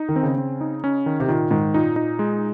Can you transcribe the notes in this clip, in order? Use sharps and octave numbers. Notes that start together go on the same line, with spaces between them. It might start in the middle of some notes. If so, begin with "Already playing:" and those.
Already playing: D#4
D#3
C4
C#3
C4
D#4
C#4
D#3
C3
A#2 D#3
G#2 D#3
A#2 D#4
D#4
G#3